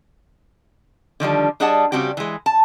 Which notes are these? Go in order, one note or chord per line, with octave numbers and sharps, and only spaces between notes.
D3 D#3 F3 G3
G3 D4 G#4 D#5 F#5 A5
C#3 G3 C4 F#4 G4
E3 G#3
A5